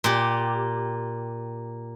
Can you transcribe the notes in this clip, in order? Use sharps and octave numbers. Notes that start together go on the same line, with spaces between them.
A#2 G4